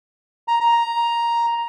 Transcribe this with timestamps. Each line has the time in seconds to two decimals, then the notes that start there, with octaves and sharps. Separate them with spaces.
0.48 A#5
0.61 A#5